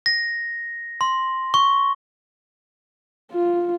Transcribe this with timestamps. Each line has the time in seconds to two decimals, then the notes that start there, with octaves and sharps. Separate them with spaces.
0.06 A#6
1.01 C6
1.54 C#6
3.32 F4